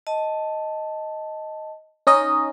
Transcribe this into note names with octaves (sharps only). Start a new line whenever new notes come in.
D#5 A5
C#4 D#4 D#5